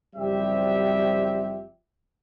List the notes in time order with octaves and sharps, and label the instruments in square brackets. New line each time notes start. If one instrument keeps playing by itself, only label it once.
[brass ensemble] F#1 F3 G3 C4 G4 E5